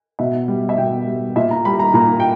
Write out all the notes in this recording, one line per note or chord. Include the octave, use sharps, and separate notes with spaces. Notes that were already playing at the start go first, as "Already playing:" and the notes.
B2 E5
G3
E5
B2 G5
G3
A#2 E5
A#5
G3 B5
A#5
A#2 A#5
G5